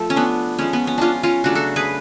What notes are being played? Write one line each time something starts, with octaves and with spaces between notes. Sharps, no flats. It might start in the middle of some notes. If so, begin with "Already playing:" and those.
Already playing: F3 A3 A4
C#4
B3 D4
F3 G#3 B3 C#4
B3
C#4
C#4 D4 F4
C#4 F4
C#3 F#3 A3 D4 F#4
F#4 A4
G#4 B4